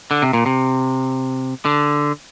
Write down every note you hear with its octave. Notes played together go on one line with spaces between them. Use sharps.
D3
C3
A#2
C3
D3